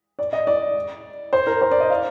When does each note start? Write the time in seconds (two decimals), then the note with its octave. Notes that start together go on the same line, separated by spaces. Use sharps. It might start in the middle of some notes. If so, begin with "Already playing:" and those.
0.19 D5
0.33 D#5
0.47 D5
1.33 C5
1.47 A#4
1.61 C5
1.71 D5
1.80 D#5
1.90 F5